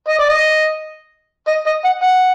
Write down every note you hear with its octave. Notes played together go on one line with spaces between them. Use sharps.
D#5
D5
D#5
D#5
D#5
F#5
F#5